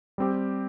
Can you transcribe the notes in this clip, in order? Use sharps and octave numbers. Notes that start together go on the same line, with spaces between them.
G3 C4 G4